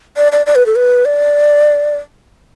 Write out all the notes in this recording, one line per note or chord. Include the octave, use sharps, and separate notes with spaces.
D5
D5
D5
B4
A4
B4
D5